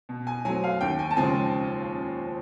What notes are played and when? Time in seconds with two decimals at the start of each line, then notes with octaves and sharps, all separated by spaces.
0.09 B2
0.27 G#5
0.45 F#3 A3 C4 G#5
0.64 F5
0.81 D#2 G5
0.99 G#5
1.11 A5
1.17 C#3 F3 G#3 C4 G#5